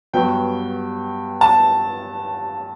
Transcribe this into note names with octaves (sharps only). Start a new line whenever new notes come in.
G2 F#3 B3 G5
A5